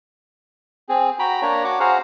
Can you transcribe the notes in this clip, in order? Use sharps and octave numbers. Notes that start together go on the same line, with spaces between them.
C4 G#4
F#4 G5 A#5 B5
A#3 D4 C#5 A#5
F#4 C#5 F#5 D6
F#4 G#4 C5 F5 F#5 A#5